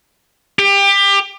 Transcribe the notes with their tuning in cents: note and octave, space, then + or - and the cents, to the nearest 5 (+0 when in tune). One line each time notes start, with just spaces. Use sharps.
G4 +25